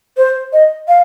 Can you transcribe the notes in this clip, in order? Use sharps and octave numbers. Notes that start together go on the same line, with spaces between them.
C5
D#5
F5